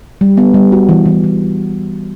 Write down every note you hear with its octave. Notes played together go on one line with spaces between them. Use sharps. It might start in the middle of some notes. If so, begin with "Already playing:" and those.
G3
B3
G3
F#4
E3
E3
E3